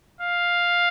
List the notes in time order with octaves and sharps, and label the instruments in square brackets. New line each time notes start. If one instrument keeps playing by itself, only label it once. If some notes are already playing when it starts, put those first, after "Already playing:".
[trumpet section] F5